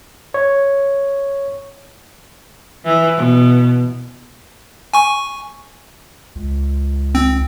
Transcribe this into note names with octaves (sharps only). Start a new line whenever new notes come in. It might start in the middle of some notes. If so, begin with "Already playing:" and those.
C#5
E3
B2
G#5 C#6
C#2
C4